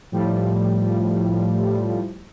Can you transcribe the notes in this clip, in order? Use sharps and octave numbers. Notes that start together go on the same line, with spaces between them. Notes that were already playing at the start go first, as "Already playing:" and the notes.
A2 F3 G3